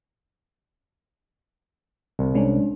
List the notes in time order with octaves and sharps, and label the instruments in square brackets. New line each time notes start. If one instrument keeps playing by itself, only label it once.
[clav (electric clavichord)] C2
[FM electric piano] G#3 C#4 D4